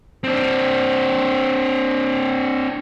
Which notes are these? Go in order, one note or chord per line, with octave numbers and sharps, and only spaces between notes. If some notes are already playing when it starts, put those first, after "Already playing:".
C4 D4